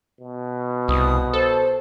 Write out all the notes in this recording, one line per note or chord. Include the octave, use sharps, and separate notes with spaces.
B2
C2 D#6
A4 C5